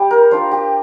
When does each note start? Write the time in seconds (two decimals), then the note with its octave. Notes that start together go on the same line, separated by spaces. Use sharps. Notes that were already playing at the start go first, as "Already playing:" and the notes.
Already playing: G3 G4
0.11 A#4
0.31 D4 F4 C5
0.51 G4